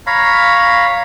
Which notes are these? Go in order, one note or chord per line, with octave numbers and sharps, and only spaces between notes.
C#5 F5 A#5 B5